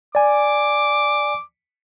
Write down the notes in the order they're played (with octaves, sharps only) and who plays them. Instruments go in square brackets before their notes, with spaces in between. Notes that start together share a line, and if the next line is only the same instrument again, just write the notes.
[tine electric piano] D5 G#5 [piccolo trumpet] D6